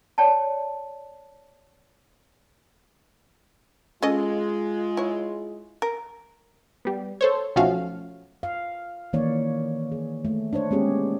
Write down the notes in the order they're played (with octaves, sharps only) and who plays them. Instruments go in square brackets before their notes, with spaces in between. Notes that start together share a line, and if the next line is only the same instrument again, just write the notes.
[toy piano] C#5 D5 G5 A5
[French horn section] G#3 F4 [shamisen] C#4 A4 D#5
[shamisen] E4 C#5
A#4
[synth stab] G3 B3
A4 C5 C#5
B1 F3 A3 C#4 F#4 F5
[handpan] F5
D#3 E3 A#3 D#4 C#5 D5
G#4
A3
D4 D#4 C5 C#5
G#3 A#3 B3 C#4 G4 G#4